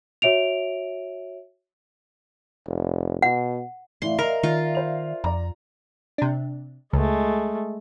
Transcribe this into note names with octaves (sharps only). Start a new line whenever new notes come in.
F#4 C#5 E5 D7 F7
F1
B2 F#5
A2 E3 D5 E5 F5 C6
A#4 D#5 A#5
D#3 F4
C5 F7
F2 D5 A#5
C3 D4
C#2 G#3 A3